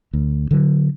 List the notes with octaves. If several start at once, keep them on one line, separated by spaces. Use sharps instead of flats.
D2
D3 F#3